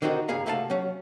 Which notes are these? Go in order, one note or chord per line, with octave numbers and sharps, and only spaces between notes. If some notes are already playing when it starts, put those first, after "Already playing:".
D3 D#3 C4 D#4 F#4
G2 C#3 G#4 F5 A#5
C2 A3 F#4 F5 G#5 A5
F#3 C#4